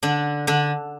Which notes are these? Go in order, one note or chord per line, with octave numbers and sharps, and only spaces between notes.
D3 D4
D3 D4